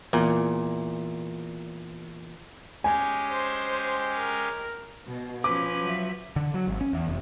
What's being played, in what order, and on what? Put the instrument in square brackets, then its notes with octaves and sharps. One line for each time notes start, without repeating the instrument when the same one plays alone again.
[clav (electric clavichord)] E2 A#2
[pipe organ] G#3 C#4 G4 [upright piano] G#5
[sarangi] C5
A#4
[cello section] B2
[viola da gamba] F3 B4 [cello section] C#4 [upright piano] D6
[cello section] F#3 E5
[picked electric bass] D3
F#3
G#1
C#4
E2
F1